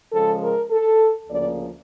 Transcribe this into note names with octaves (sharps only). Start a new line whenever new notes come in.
C#3 F3 G#3 A4
A#4
A4
D2 C#3 F3 A#3 D5